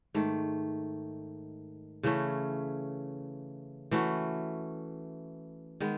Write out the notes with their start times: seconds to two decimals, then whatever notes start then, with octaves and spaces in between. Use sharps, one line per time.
0.14 G#2 D#3 A3
2.03 C#3 E3 A3 C#4
3.91 E3 A3 C#4 F#4
5.80 D#3 G#3 B3